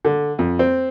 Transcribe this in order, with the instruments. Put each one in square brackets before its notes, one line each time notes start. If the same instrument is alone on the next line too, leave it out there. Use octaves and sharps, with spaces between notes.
[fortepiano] D3
F2
C4